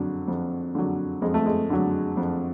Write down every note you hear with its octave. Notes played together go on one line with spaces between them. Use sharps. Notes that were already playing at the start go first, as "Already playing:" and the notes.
Already playing: F2 D3 F#3
F2
D3 F#3
F2 G#3
A3
G#3
D3 F#3
F2